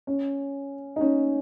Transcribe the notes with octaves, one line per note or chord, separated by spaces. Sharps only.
C#4
D#4
C#4